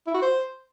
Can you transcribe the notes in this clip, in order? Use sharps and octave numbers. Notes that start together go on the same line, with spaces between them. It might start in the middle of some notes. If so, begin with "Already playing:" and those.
E4
F#4
C5